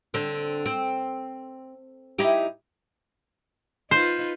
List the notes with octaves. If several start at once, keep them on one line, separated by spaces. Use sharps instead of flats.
D3 C4
C4
D#4 E4 G4
D#4 F4 B4 C5